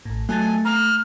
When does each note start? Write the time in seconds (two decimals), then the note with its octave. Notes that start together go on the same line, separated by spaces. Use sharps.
0.05 A1 A2
0.29 F#3 A3 G#5 A5 A6
0.65 A#5 F6